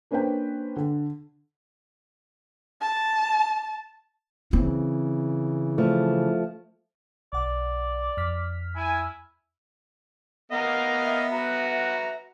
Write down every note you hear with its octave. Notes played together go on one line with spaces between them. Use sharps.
A#3 C#4 D4 B4 C5 G5
D3
A5
C#3 E3 C4
F3 A3
B1 D5 F#5
F2 F6 B6
E4 G#5
B3 A#4 D#5 F5
E5
F#4 B4 A#5